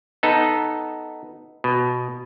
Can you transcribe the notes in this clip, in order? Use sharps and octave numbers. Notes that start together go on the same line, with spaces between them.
B3 D#4 A4
B2